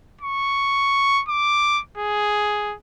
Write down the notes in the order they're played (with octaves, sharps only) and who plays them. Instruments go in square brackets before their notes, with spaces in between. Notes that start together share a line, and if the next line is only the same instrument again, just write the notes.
[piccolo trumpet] C#6
D6
G#4